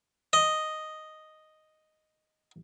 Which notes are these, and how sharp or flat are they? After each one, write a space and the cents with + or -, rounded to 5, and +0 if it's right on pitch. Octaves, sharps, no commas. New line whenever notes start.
D#5 +0